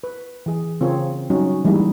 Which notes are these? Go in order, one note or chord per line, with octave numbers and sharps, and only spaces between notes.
B4
E3 G#4
C#3 C4 F4 G#4 A#4 C#5
F#3 G3 C#4 D#4 F#4
E3 G3 G#3 A#3 D#4 E4